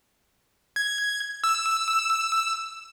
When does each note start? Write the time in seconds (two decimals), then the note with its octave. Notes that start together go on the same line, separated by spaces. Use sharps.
0.76 G#6
1.44 E6